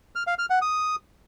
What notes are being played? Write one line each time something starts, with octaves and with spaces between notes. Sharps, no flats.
F6
F5
F6
F#5
D#6